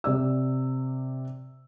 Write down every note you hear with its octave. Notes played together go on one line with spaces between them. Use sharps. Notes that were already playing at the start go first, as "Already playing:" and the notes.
C3 D5 E6